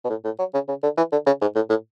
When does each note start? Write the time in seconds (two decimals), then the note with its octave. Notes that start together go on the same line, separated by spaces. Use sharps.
0.04 B2
0.10 A2
0.24 A2
0.39 F#3
0.54 C#3
0.68 C#3
0.83 D3
0.97 E3
1.12 D3
1.26 C#3
1.41 G#2
1.55 A2
1.69 A2